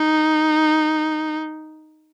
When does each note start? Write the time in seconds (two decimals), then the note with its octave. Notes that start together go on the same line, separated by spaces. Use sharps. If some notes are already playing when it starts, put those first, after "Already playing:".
Already playing: D#4